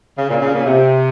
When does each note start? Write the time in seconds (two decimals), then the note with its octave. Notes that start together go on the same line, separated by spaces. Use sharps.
0.18 C#3
0.30 A#2
0.42 C#3
0.54 A#2
0.66 C3